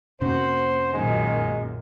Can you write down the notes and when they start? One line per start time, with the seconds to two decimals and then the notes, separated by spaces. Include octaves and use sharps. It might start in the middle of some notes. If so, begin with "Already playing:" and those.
0.21 F2 C3 A#3 C#4 F#4 C5
0.93 B1 F#2 A#2 D#3 G#3